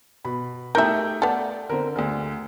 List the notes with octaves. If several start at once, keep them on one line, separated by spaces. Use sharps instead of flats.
B2 B5
A3 D#4 G4 A#4 E5 G5 G6
B3 A4 D5
D3 C4 A#4
D2 D3 G#4